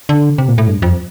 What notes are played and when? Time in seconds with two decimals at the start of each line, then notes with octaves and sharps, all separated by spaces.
0.09 D3
0.38 C3
0.48 A#2
0.58 A2
0.67 G2
0.82 F2